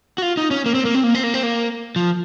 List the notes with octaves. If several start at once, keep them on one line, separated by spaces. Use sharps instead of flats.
F#4
F4
D#4
C#4
A#3
C4
A#3
C4
A#3
C4
A#3
C4
A#3
F3